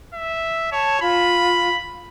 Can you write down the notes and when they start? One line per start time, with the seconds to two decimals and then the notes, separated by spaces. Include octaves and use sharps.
0.13 E5
0.72 C#5 A5
1.01 F4 B5